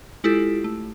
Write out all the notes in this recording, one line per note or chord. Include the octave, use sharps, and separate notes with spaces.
G#3 E4 F4 G4 A4
A3